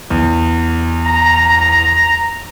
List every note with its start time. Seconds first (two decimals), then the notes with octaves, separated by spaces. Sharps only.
0.10 E2
1.05 A#5